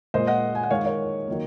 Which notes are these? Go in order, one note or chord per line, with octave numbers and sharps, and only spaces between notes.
A#2 G#3 C5 D#5
D#5 F#5
G#5
F#5
D#3 G#3 C#5 F5
A#4 C#5
D#3 F#3 A#3